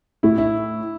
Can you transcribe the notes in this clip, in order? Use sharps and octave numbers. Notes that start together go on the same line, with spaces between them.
A2 E4
E4